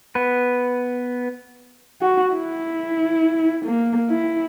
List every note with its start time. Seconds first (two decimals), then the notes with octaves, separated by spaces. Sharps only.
0.15 B3 B4
2.01 F#4
2.33 E4
3.65 A#3
4.10 E4